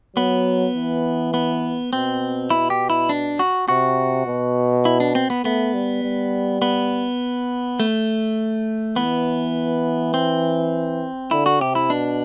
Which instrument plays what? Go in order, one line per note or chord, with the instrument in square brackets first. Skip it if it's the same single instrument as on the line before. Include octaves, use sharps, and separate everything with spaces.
[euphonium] F#3 [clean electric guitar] B3
[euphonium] E3
[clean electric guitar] B3
[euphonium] B2 [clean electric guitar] C4
[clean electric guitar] E4
G4
E4
D4
F#4
[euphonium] C3 [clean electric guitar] F#4
[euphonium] B2
[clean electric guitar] E4
D4
C4
B3
[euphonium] A3 [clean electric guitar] B3
[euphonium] G3
G3
[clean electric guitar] B3
A3
[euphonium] E3 [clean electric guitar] B3
[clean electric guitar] C4
[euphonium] D3 [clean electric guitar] E4
[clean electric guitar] F#4
[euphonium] C3 [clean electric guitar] G4
[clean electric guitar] E4
[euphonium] B2 [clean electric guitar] D4